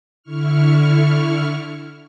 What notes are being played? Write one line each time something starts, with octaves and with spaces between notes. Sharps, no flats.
D3 E4 C#6 F6